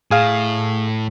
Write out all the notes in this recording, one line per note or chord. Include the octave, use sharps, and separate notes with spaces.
A2 G#4 F5